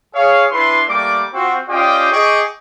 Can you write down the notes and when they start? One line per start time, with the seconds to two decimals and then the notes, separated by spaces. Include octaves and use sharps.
0.15 G#4 C#5 F5
0.51 D4 E4 B4 C6
0.88 G3 A3 A#3 D5 D6
1.33 C4 F4 F#4
1.68 C#4 F4 G4 D5 D#5 G5
2.11 G#4 D#5 G5 C#6 D6